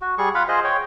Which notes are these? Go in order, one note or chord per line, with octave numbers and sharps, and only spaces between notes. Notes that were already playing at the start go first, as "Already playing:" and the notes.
F#4
G3 G#4 C#6
F4 F5 F#5 B5
F4 G#4 C5 D#5
C#5 G5